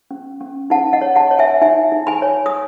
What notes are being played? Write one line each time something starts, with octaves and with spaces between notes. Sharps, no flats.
C#4
C#4
D#4 F#5 A5
D#5 F#5
C#5
F#5 A5
C#5
E5 G#5
D#4 E5 G#5
D#4
G#5 B5
C#5
D#6